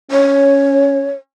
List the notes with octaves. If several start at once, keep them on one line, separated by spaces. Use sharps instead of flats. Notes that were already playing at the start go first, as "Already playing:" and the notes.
C#4 C#5